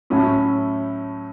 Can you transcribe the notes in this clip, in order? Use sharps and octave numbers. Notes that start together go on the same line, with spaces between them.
A2 F#3 A3 C#4 E4